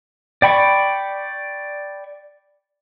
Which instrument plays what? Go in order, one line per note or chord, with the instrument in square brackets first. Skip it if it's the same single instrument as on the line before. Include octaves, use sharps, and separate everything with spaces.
[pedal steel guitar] D5 G5 B5 C#6